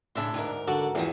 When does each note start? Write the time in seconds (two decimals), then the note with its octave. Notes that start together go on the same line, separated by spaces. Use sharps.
0.15 A2 C#3 D4 E5 C6
0.34 D2 G#2 A#4
0.68 D3 F#4 D5
0.95 E2 G2 F3 F#3 D#6